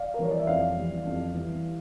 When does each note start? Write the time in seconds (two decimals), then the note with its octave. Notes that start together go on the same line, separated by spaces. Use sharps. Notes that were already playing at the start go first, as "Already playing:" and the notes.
Already playing: D5 F5
0.14 A#4
0.19 E3 G3 C#5
0.31 D5
0.39 E5
0.47 F2 D5 F5
0.76 E3 G3
1.05 F2
1.34 E3 G3